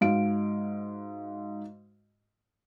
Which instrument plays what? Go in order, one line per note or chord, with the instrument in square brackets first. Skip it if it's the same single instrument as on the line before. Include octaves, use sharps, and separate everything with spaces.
[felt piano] G#2 F#4 F5 D7